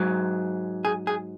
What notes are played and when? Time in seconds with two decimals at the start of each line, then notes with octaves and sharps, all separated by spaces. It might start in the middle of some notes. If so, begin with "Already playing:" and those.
Already playing: G#2 F#3
0.85 G#4
1.07 G#4